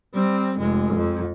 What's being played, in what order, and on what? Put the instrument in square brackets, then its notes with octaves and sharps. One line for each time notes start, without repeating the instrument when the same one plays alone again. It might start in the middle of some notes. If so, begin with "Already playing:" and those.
[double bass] G3 C4
F1 G#3
F2